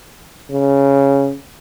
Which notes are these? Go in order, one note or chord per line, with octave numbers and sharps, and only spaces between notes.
C#3